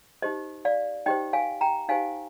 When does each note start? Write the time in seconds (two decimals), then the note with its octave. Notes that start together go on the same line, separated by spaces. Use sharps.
0.22 D#4 G4 C5 D#5
0.65 D5 F5
1.06 D#4 G4 C5 D#5 G5
1.33 F5 G#5
1.61 G5 A#5
1.89 D#4 G4 C5 F5 G#5